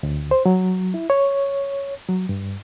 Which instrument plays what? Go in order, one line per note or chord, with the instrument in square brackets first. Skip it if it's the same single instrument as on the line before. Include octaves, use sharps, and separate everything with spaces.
[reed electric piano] D2
C5
F#3
E4
C#5
F#3
G2